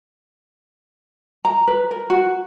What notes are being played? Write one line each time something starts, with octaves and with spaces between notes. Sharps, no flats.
A#5
B4
A#4
F#4